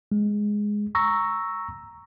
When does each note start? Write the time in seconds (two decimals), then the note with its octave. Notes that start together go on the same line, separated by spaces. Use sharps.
0.12 G#3
0.95 A#5 C#6 E6 A#6